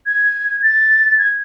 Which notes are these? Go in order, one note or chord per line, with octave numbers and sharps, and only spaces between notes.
G#6
A6
G#6